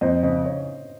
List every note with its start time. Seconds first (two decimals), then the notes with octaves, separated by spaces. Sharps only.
0.01 F2 C5 D#5
0.23 C#3 C5 D#5
0.45 C#5